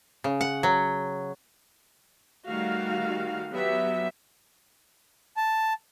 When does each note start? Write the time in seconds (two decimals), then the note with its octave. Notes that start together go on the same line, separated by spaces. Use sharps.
0.24 C#3
0.41 F#5
0.63 F#3
2.46 D#3 G3 A3 F#4 F5
3.51 F#3 B3 G4 E5
5.37 A5